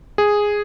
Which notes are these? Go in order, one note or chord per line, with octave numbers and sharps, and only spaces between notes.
G#4